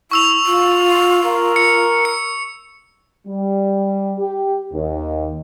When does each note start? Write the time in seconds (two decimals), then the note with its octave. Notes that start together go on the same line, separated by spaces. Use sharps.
0.11 E4 C#6 E6 F7
0.46 F4
1.25 A#4
1.56 C#7
2.05 C#7
3.27 G3
4.19 G4
4.72 D#2